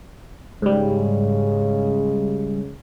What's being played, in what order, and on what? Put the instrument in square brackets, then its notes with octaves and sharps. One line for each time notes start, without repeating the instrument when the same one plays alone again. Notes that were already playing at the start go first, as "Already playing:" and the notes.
[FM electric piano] G#2 G3 [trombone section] C#3 G#3